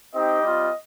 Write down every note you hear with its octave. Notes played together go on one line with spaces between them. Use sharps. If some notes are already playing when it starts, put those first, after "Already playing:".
C4 D#4 G4 D#5
G3 C4 F4